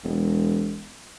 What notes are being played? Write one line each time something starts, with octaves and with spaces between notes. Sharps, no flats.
E1